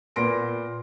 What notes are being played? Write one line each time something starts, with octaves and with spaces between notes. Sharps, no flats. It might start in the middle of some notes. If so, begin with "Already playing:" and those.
A#2 B3 C6 A#6 D7